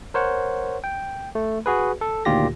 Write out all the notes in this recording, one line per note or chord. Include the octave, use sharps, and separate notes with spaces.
A#4 C5 C#5 F#5
G5
A3
F#4 G#4 B4
A4
D2 A#2 D#3 F4 G4 A#6